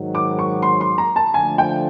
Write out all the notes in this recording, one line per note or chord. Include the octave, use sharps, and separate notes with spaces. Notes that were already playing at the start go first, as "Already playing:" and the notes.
Already playing: G#2 D#3 F#3
D6
C#6
C6
C6
A#5
A5
D3 F3 A3 G#5
G5